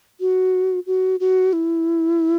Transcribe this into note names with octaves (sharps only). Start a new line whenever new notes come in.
F#4
F#4
F#4
E4